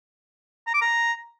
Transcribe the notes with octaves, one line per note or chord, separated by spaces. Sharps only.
A#5
D6
A#5